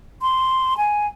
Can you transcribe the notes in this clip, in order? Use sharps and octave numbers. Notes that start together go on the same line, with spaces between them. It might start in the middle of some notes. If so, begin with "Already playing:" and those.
C6
G#5